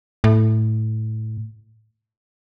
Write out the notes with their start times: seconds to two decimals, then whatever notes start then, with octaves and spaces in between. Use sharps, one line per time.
0.24 A2